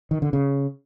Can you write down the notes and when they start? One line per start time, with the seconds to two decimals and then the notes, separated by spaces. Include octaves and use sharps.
0.11 D#3
0.22 D3
0.33 C#3